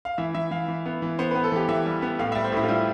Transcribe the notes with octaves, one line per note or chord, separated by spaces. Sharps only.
F5
E3 E5
E3 E5
E3 F5
E3
B3
E3
B3 C5
B4
B3
A4
E3 G4
E3 E5
G3
B3
A2 F5
E5
G3
C5
A2 E4
F4
G3 E4